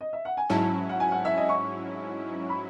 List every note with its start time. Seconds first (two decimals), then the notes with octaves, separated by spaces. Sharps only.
0.01 D#5
0.13 E5
0.25 F#5
0.37 G#5
0.50 G#2 F#3 C#4 E4 A5
0.89 F#5
1.00 G#5
1.12 F#5
1.25 E5
1.37 D#5
1.49 C#6
2.49 B5